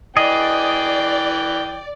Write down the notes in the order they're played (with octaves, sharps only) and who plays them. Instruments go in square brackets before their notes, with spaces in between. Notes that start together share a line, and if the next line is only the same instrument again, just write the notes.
[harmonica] E3 G5 [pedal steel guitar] G#4 D#5 [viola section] D5